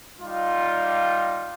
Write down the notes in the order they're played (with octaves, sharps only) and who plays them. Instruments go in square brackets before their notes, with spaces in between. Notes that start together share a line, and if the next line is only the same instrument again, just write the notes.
[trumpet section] G3 D#4 F4